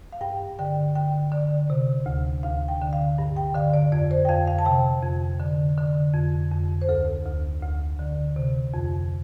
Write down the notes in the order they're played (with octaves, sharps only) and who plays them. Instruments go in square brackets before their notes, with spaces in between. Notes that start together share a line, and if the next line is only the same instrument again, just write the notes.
[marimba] F5
G2 G5
D3 G5
D3 G5
D3 D5
C3
D2
D2 F5
G5
D3
F5
G2
G5
D3 F5
D5
F2 D5
C5
G5
F2 F5
F5
A5
C3 G5
F2
D3
D3
F2
F2
C5
D2 A4
D2
D2
D3
C3
F2